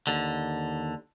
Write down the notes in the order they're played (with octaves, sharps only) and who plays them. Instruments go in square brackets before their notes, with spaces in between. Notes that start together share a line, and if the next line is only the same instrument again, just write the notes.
[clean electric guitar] D#2 D3